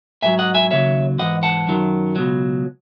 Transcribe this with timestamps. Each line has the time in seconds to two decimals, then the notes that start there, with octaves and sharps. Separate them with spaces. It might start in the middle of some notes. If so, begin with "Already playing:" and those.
0.23 G#2 F#3 E5 G#5
0.39 D#5 F#5
0.54 E5 G#5
0.71 D#2 C#3 F#3 C#5 E5
1.19 G#2 E3 D#5 F#5
1.43 F#5 A5
1.68 F#2 D#3 F#3
2.16 C#2 B2 F#3